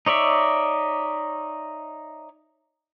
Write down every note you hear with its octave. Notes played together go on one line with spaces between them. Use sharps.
D#4 C#5 D5 E5